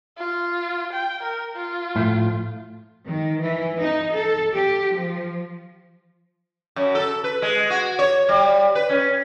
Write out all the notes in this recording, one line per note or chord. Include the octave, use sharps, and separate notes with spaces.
F4
G5
A#4
F4
A2 F3
D#3
E3
D#4
A4
G4
F3
F#2
A4
B4
G#3
F#4
C#5
G3
B4
C#4